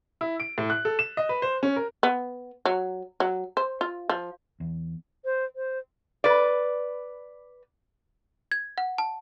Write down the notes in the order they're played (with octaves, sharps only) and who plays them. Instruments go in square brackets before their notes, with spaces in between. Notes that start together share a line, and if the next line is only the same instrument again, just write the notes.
[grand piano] E4
D7
A2
F#6
A4
E7
D#5
B4
C5
C#4
A#4
[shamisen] B3
F#3
F#3
C5
F4
F3
[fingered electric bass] E2
[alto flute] C5
C5
[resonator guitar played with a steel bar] B4 D5
[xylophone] G#6
F#5
A5